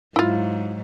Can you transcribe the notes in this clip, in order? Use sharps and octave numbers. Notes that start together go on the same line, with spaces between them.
G#2 F#3 E4 F4